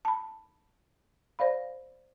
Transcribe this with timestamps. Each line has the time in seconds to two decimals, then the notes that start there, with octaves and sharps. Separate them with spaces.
0.05 A5 B5
1.39 C5 D5 F5 B5